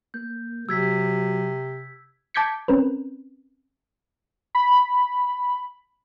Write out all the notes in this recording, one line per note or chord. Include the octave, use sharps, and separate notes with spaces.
A#3 G6
C3 F#3 E6 G#6 B6
A5 D6 G6 G#6 B6 C#7
C4 C#4 A#4 B4
B5